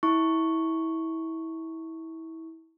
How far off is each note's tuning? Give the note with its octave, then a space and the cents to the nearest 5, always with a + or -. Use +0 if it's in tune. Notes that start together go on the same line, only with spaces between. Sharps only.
E4 -25 C#6 +0